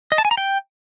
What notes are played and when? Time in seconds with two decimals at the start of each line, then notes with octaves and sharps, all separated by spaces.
0.12 D#5
0.18 A5
0.25 G#5
0.31 A#5
0.37 G5